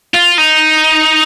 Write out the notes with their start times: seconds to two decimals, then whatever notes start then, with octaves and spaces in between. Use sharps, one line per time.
0.14 F4
0.38 D#4